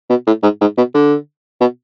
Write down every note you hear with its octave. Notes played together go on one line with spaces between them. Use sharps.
B2
A2
G#2
G#2
B2
D3
B2